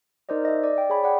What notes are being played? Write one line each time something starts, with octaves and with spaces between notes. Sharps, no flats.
D#4 A#4 C5 D5 D#5
D#5 E5
D5
G5
G#4 C#5 G#5 B5
D5 F#5 G5